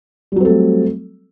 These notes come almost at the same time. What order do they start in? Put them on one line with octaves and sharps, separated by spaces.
G3 F#3 C4 A4 A3